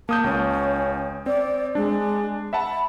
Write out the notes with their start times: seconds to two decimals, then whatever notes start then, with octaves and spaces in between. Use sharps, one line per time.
0.09 A#3 A5 D#6 G6
0.24 C#2 C#4
1.26 C4 D5
1.75 G#3 D4
2.53 E5 F#5 A5 B5